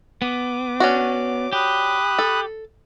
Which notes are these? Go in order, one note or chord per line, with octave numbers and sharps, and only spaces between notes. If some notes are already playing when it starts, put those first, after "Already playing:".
B3 D6
C#4 D4 F#4
G4 B5 D#6 F#6
A4